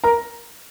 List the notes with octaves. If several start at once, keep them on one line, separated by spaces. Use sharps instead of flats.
A#4 A#5